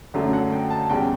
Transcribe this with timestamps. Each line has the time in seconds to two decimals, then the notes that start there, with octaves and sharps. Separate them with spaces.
0.14 F#2 D3 F#3 A3
0.33 F#5
0.52 G5
0.70 A5
0.89 E2 C#3 G3 G5